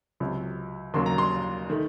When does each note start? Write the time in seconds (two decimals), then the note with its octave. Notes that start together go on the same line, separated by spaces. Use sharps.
0.20 C#2 C3 F#3
0.94 D#2 C#3 F#3 A#3 C6
1.06 A#5
1.18 C6
1.70 D#3 A3